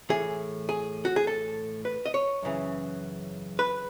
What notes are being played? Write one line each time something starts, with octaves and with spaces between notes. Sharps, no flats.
A2 E3 G#4
G#4
F#4
G#4
A4
B4
D#5
C#5
F#2 C#3 E3
B4